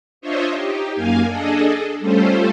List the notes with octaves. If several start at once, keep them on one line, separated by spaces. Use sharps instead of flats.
D4 F4 C5 C#5 D#5 E5
D#4 G4
F#2 A#3 F5 G#5
D4 G#4 A4 D#5
G3 A3 C#4 F4 A4 C5